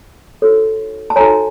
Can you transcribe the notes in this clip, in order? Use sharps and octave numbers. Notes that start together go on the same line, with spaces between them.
D#4 F#4 A4 C#5
A5
D#4 F#4 A4 C#5 G#5 A#5